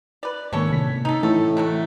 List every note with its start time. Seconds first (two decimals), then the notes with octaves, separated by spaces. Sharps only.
0.23 B4 D5
0.53 G#2 D#3 A#3 C#4 A4 C#5
0.70 A2 C3 B6
1.05 D#4 A4
1.23 A2 E3 A4
1.57 C3 F#3 A3